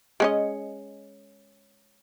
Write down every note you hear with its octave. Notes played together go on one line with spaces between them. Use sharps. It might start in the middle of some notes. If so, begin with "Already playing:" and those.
G#3 C#4 D#5